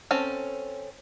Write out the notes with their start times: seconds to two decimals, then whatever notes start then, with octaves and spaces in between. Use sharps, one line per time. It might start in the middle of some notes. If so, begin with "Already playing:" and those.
0.11 C4 C#4 A4